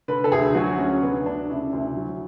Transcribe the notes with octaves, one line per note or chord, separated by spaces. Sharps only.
D3 B4
A4
D2 G#4
F#3 F#4
D2 C#4
D3 B3
D2 D4
C#3 E4
D2
F#3